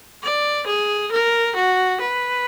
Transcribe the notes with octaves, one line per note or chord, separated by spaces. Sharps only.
D5
G#4
A#4
F#4
B4